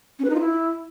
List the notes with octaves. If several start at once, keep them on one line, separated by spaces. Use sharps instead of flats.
C#4
B4
D#4
F4
E4